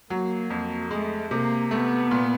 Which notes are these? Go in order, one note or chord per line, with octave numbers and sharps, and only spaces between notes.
F#3 A#3
F2
G#3 A3
C3 A#3
A3 B3
A#2